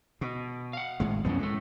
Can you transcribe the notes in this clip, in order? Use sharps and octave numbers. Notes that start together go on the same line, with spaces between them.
B2
F5 F#5
G#1 A2 G#3
C2 F#2 F3 B3 C#4
A2 G#3 A4